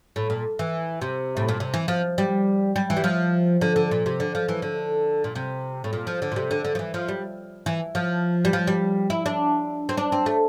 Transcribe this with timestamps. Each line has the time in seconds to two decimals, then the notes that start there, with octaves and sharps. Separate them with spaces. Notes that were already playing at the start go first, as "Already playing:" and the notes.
0.16 A2
0.30 A#2
0.59 E3
1.01 C3
1.37 A2
1.48 A#2
1.60 C3
1.74 E3
1.88 F3
2.18 G3
2.76 G3
2.90 E3
2.96 G3
3.04 F3
3.61 D3
3.76 D3
3.91 A#2
4.06 C3
4.20 D3
4.35 F3
4.49 E3
4.62 D3
5.24 A#2
5.35 C3
5.84 A2
5.93 A#2
6.07 F3
6.22 D3
6.32 A#2
6.36 C3
6.51 D3
6.65 D3
6.75 F3
6.79 E3
6.94 F3
7.08 G3
7.66 E3
7.95 F3
8.45 G3
8.53 F3
8.67 G3
9.10 E4
9.26 D4
9.89 C4
9.97 D4
10.12 C4
10.26 A3